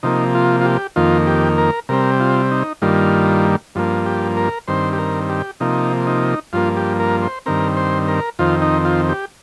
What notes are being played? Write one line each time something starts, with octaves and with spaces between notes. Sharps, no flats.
C3 F3 A#3 D#4
F4
F4
G4
F2 D#3 A#3 F4
G4
A#4
C3 G3 C4 A#4
F4
D#4
G2 D#3 G3 A#3 F4
G2 F3 A#3
G4
A#4
G2 D#3 C4 C5
G4
A#4
G4
C3 F3 A#3 D#4
D#4
G2 F3 A#3 F4
G4
A#4
C5
G2 D#3 C4 A#4
C5
A#4
F2 D#3 C4 F4
D#4
F4
G4